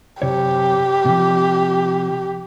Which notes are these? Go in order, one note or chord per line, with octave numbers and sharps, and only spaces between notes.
F#2 C3 G4 C#5
C3 F3